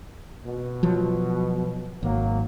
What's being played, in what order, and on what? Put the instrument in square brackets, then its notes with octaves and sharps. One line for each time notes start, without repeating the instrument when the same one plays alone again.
[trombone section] B2
[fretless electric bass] F3 F#3
[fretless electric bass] G#1 [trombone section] F#3 A#3